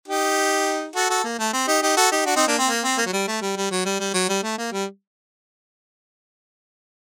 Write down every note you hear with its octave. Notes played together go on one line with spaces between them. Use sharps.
D#4 G4
F#4 A4
F#4 A4
A#3
A3
C4
D#4 G4
D#4 G4
F#4 A4
D#4 G4
D4 F#4
C4 D#4
A#3 D4
C4
A#3
C4
A#3
F#3
G3
A3
G3
G3
F#3
G3
G3
F#3
G3
A3
A#3
G3